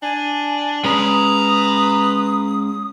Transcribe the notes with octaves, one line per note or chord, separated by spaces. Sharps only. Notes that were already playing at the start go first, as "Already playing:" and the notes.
D4 G#5
G#3 C#4 B4 A#5 C6 D#6